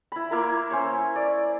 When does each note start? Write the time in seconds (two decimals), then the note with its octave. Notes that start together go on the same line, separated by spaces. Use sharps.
0.12 E4 B5
0.31 A#3 E4 A#4
0.71 C#4 C5 C#5
1.16 D5